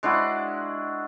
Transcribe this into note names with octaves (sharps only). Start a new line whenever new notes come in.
G#3 D4 E4 F#4